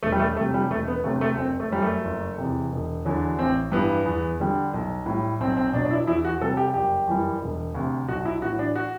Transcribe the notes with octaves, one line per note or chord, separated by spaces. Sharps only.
E1 A3
G3
A3
D2 C3 G3 A3
G3
E1 A3
B3
D2 C3 F#3 A3
A3
F#1 C4
A3
F#2 F#3 G3
A3
F#1
E2 C3
E1
E2 D3 F#3
A1 C4
G2 E3 B3
E2
D3 G3
B1
A2 G3
B1 C4
C4
B2 F#3 D4
D4
E4
E2 E4
F#4
C3 G3 A4
G4
F#1 G4
F#2 E3 G3
E1
D2 C3
B1 F#4
E4
A2 E3 F#4
D4
F#4